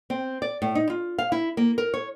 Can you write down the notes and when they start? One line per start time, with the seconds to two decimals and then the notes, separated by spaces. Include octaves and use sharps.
0.10 C4
0.42 D5
0.62 A2
0.75 D#4
0.90 F4
1.18 F5
1.32 E4
1.57 A#3
1.78 A#4
1.94 C#5